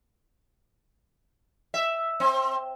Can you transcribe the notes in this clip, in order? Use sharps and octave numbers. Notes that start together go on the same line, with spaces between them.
E5
C4